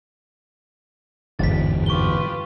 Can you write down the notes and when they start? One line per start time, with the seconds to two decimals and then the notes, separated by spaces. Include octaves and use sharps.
1.39 G1 E2 G#2 B2 A6 B6
1.86 F4 G4 B4 C#6 G7